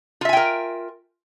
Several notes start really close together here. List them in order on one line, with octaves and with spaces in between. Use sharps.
F4 E5 G#5 G5 A#4